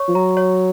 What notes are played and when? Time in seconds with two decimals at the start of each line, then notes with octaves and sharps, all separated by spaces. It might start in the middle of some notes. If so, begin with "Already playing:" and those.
Already playing: C#5 C#6
0.08 F3
0.15 F#3 A#5
0.37 C#5